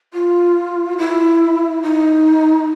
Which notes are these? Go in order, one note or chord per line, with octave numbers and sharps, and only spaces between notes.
F4
E4
D#4